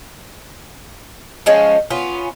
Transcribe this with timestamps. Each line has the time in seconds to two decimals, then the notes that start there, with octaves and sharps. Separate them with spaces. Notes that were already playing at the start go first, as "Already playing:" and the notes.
1.46 F3 G#3 C#4
1.91 B3 C#4 F4